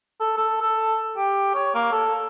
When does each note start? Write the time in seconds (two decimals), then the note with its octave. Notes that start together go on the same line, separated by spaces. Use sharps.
0.20 A4
0.37 A4
0.61 A4
1.17 G4
1.54 C#5
1.74 A#3
1.92 A4